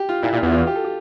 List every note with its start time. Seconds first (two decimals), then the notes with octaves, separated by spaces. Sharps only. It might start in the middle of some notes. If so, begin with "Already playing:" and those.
Already playing: G4
0.09 F4
0.23 A#2 E4
0.33 A#2
0.37 F4
0.42 E2
0.52 F4
0.67 G4
0.76 A4
0.84 G4